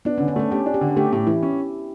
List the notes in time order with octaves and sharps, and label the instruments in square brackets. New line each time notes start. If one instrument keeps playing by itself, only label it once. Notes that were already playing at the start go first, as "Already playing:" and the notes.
[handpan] B3 [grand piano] D4
[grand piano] D3 [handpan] C#4
[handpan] D4
[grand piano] A3 [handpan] C#4
[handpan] C#4 [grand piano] G4
[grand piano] D4
[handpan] G4
[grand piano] D3
[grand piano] A3 [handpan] G4
[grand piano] A2 [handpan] G4
[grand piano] E3 [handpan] E4
[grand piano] C#4